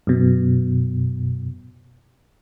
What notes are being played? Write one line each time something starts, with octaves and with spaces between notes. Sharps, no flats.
F#2 B2